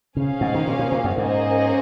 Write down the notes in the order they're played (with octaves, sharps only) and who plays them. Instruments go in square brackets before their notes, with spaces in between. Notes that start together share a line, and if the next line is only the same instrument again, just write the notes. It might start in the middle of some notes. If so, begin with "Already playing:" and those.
[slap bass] C#3 [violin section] C#4 G#4 C5 F5
[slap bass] G#2
D#3
A#2
A#2
A#2
F#2
[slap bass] G#2 [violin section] A#3 C#4 G#4 C5 D#5